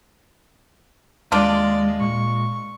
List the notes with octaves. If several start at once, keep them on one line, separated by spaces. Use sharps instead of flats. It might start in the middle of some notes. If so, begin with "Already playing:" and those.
D#2 G#3 D4 F4 D5
A#2 C#6